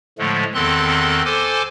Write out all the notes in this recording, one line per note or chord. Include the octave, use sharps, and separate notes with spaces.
A2 D3 F3 G#3 A3
E2 D#3 C4 A4 C6 F#6
A4 C5 G#5 A5 C6 D6